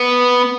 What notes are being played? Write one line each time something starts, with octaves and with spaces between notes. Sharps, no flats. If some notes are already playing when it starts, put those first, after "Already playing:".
Already playing: B3